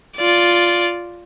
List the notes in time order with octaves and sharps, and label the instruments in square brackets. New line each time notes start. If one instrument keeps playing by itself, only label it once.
[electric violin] F4 D5